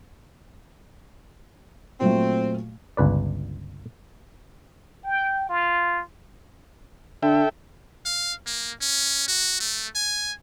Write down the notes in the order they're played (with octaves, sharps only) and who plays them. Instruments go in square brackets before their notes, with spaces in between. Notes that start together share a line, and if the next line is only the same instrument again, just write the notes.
[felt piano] A#2 F#3 A3 [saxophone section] C4
[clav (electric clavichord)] G1 C#2 B4 D5
[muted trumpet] G5
F4
[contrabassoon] D3 [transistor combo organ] A4 E5 G5
[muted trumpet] F5
A#3
C#4
F#4
A3
G#5